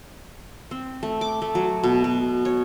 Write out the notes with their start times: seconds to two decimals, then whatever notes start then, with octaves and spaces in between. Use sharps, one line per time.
0.71 C4
1.03 A3
1.21 D6
1.42 A3
1.55 F#3
1.84 B2
2.04 B2
2.45 C#5